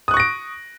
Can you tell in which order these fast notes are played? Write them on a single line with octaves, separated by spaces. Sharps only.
D#6 F#6 C#6 A#6 D7